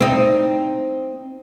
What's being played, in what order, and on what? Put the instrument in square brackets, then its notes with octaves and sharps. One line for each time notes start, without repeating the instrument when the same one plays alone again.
[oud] C4 D#4